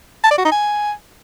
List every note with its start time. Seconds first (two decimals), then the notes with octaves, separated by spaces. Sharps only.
0.24 A5
0.31 D5
0.38 F#4
0.45 D#4
0.52 G#5